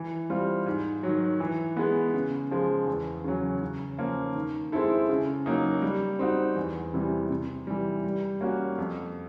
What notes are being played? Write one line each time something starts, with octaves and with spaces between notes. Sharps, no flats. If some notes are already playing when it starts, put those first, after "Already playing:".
Already playing: E3
G3 C4 F4
G#2
D#3 F#3
E3
G#3 B3
C#3
F3 G#3
E2
C#3 F#3
C#3
F3 A#3 C#4
D#3
G#3 C4 E4 A4
C#3
F#3 A#3 D#4
G3
C4 D#4 F#4
E2
C3 E3 G3
C3
E3 G3
G3
A#3 C#4 F#4
F2